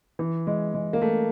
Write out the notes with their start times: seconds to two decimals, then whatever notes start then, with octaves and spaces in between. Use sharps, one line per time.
0.19 E3
0.47 G#3
0.74 G#3
0.93 A#3
1.02 A3